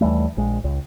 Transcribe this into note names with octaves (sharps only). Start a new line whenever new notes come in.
D#2 E3 G3 A3
A#1 G#3
C#2